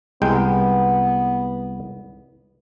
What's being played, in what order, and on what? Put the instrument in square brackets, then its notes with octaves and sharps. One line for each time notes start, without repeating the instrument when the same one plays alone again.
[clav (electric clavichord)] C2 G#3 G5 [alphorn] B3